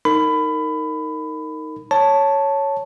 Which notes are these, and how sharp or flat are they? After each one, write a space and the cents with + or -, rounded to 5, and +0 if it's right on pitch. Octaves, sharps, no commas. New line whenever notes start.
D#4 +10 A#4 -25 B5 +20
C#5 +0 A5 +0